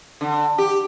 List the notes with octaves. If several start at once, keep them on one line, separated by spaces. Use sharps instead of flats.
D3
G4